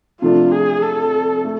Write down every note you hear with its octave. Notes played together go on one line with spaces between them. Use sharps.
C3 F3 A3 D4 F4
G#4
A4
A3